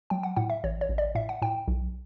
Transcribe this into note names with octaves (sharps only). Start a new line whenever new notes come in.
F#3 G5
F#5
A2 F#5
E5
A1 C#5
C#5
A1
D5
A2 E5
F#5
A2 G5
B1